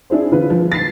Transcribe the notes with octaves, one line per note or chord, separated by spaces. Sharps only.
D4 E4 G#4 C5
D3 E3 F4 B4
F3
A6 B6 C7